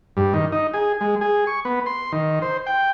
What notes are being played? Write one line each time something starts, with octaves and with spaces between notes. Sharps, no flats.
G2
D#3
D#4
G#4
G#3
G#4
C#6
B3
C6
D#3
C5
G5